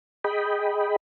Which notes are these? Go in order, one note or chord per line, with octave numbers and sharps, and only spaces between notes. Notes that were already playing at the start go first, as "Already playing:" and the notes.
G#4 D#5 G5 B5